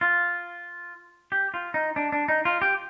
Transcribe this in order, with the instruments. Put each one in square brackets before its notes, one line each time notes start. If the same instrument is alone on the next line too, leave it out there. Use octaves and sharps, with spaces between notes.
[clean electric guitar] F4
G4
F4
D#4
D4
D4
D#4
F4
G4